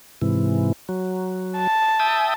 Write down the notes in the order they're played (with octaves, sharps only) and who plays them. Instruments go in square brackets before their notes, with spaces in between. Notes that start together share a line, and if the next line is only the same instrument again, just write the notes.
[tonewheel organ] G#2 C3 E3
F#3
[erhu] A5
[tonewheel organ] E5 G5 D#6